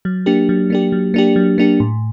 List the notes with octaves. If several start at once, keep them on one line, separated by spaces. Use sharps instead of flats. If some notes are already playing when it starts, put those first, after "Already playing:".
F#3
A#3 D4 G4
F#3
A#3 D4 G4
F#3
A#3 D4 G4
F#3
A#3 D4 G4
A2